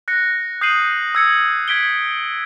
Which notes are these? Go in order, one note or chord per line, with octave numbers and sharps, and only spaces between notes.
F#6 A#6 C#7
D#6 G6 C7 D#7 F#7
E6 G#6 C#7
G#6 B6 D7 G7